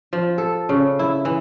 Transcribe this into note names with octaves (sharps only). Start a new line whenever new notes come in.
F3
A4
C#3
E4
E3